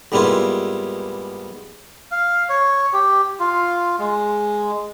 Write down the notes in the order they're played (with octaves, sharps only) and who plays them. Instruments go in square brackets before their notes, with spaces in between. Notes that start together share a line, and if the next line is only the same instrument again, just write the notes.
[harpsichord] G#2 G3 A#3 B3 E4 F4
[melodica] F5
C#5
G4
F4
G#3